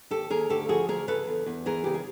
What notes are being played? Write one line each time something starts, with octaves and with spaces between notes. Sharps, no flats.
D#2 G4 A4
D#2 G#4 A#4
D2 G4 A4
F3 F#4 G#4
D2 G#4 A#4
C#3 A4 B4
E2
E2
E3 G#4 A#4
C#3 G4
G#4